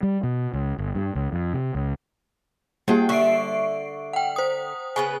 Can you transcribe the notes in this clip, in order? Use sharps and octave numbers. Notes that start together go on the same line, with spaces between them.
G3
B2
C#2
G1
G2
C#2
F2
C3
C#2
G3 A#3 G4 G#4 G5
D3 E5 C#6 C7 D7
F#5 G5
C5 D#6
C#3 B3 B4 G#5